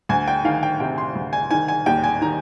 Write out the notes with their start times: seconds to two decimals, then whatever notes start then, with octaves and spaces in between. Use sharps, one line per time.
0.09 D2 G#5
0.28 G5
0.44 D#3 F5
0.63 G5
0.80 C3 G5
0.98 C6
1.15 D2
1.33 G#5
1.51 D#3 G#5
1.68 G#5
1.86 D#2 G5
2.04 G#5
2.21 D#3 A#5